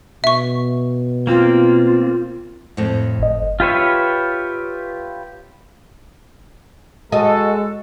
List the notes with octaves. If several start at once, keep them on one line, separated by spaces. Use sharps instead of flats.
B2 E5 C#6
A#3 C4 F4
F2 A2
G1 D#5
F4 G4 B4 C#5 E5
G#3 F#4 A4 D#5 F5